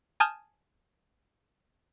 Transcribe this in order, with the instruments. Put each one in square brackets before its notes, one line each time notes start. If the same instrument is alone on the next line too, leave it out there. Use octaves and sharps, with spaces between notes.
[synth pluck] G#5 A5 D#6 F6 G6